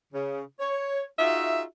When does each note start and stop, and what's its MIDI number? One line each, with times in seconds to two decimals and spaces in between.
0.13 0.42 49
0.60 1.04 73
1.19 1.63 63
1.19 1.63 65
1.19 1.63 66
1.19 1.63 68
1.19 1.63 76